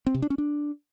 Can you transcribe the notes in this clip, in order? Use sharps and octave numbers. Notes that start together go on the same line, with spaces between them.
C4
C3
D4
C#4
D4